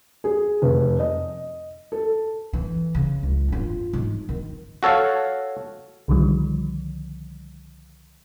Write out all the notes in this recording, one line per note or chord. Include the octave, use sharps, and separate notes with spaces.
G#4
F1
D#5
A4
E3
C#3
C#2
G2 F4
G#2
D#3
F#4 A4 C#5 F5
C2 D3 D#3 F3 G3